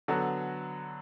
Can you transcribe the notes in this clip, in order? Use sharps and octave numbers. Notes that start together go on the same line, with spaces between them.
D3 F#3 B3 F#4 A4